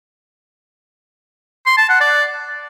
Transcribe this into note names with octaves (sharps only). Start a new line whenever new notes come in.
C6
A5
F#5
D5